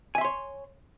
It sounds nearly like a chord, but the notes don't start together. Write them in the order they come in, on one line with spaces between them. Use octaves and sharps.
G#5 E5 C6 C#5